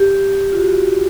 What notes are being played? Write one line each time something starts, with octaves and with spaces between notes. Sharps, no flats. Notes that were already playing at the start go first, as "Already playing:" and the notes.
Already playing: G4
F4
F#4